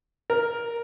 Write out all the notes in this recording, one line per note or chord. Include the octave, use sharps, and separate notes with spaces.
A#4